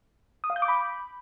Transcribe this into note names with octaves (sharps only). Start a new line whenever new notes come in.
D#6
F5
G6
D6
B5